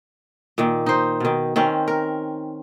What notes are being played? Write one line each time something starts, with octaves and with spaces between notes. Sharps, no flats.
A#2 D#3
D#4 C5
B2 D#3
D#3 C4 C#4
A#4